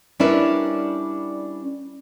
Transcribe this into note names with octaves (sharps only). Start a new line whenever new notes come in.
G3 C#4 D4 E4 A#4 B4